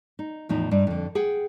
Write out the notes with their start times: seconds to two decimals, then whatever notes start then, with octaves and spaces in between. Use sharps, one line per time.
0.19 D#4
0.49 E2 A2 F3 D#4
0.71 G2 D4 D#4
0.87 F2 D3
1.15 G#4 F#5 G5